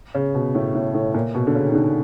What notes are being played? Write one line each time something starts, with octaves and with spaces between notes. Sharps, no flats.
C#3
B2
A2
A2
A2
A#2
B2
D3
C#3
D#3
D3